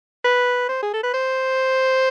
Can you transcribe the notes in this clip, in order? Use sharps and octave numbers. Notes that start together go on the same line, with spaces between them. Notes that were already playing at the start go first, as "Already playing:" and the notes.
B4
C5
G#4
A4
B4
C5